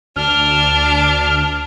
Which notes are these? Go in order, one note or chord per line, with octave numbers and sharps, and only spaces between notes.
D2 D4 F6